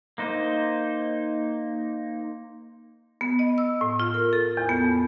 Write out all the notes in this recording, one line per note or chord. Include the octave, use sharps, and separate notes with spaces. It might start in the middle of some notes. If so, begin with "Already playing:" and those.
A#3 D#4 C5
B3
D#5
E6
A2
F4
A#4
A4
E2
B3
F2